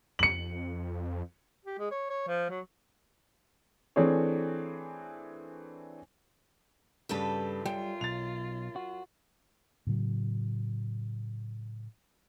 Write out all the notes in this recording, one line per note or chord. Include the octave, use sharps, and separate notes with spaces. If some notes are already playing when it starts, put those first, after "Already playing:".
F2 C#7 F#7
G4
G#3
C#5
C#5
F3
F#3
E3 A3 C4 D4 G#4 C#5
G2 C#3 G4 A4 B4
F#2 G3 F4 G5
B1 A6 F7
F#4
A2 C#3 F#3